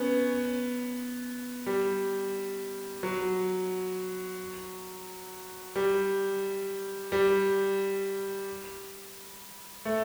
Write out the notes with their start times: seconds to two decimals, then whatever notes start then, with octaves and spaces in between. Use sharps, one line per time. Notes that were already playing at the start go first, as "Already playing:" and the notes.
Already playing: B3 C#4
1.66 G3
3.03 F#3
5.76 G3
7.12 G3
9.85 A3